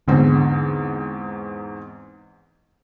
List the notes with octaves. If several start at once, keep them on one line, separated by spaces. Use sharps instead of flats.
E2 G#2 D3 C4